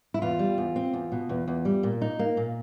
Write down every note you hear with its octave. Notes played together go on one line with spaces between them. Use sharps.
E4
E2 F4
G3
E2
C4
E2
B2
E2
E2
G3
A#2
D#4
A#3
A#2